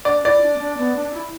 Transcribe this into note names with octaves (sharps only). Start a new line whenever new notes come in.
D4 D5
E4 D5
D4
B3
D4
B3
D4
D4
E4